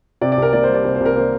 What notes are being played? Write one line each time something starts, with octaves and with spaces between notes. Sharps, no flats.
C3 D5
D5
C2 A#4
A#3 D5
C5
G3
D5
C3 C5
C5
C2
A#4
A#3 C5